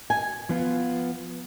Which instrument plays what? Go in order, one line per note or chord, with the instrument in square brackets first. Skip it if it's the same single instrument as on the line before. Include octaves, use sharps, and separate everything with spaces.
[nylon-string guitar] G#5
[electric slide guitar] F3 B3 F4